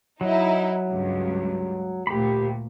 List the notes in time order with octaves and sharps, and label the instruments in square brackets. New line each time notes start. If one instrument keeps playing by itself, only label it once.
[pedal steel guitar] F#3 [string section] D#4 E4
[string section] C#2 G2
[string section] D2 A#2 [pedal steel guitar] G4 B5